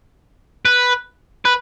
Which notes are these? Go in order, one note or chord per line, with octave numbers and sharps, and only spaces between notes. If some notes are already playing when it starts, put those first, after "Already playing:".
B4
B4